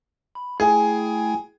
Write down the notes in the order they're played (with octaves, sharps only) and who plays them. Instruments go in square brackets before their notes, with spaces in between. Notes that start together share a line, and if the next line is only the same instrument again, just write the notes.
[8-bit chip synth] B5
[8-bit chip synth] A3 E4 G5 [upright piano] G#4